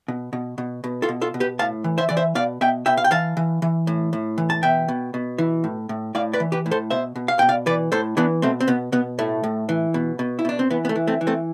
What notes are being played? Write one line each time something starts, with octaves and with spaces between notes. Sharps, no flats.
B2
B2
B2
B2
F4 A4
B2
F4 A4
B2
G4 B4
A2 F5 A5
E3
C5 E5
E3 D5
C5 E5
B2 D5 F5
B2 E5 G5
B2 E5 G5
F5
G5
E3 F5 A5
E3
E3
A2
A2
E3
A5
B2 E5 G5
B2
B2
E3
A2
A2
A2 D5 F5
B4 D5
E3
G4 B4
A2
A4 C5
B2 C5 E5
B2
F5
B2 G5
D5 F5
E3 B4 D5
A2 A4 C5
E3 B3 D4
B2 A3 C4
C4
B2 B3
B2 B3
A2 A3
A2
E3
B2
B2
E4
B2 D4
C4
E3 B3
B3
A3
E3
A3 C4
E3
A3 C4